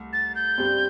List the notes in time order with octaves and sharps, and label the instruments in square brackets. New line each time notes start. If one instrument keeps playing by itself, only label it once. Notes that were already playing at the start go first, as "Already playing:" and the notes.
Already playing: [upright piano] C2 A3
[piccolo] A6
G6
[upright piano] G2 G3 C4